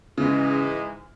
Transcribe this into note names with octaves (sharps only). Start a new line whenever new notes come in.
G#2 C#3 E3 G#3